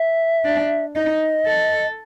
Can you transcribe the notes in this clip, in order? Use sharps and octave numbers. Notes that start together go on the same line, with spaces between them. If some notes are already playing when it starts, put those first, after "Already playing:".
Already playing: E5
D4
D#4 D#5
A4